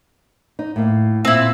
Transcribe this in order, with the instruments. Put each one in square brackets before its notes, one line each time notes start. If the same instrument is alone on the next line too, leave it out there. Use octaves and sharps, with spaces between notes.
[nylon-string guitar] D#4
A2 A#3
[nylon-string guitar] A#2 [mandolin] C4 E4